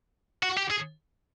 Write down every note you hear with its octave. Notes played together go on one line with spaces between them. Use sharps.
F#4
G4
G#4